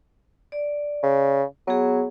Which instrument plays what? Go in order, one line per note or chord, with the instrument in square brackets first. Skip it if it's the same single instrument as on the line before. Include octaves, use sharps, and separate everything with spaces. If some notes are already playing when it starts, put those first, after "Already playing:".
[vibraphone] D5
[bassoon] C#3
[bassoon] F#3 [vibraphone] B3 G#4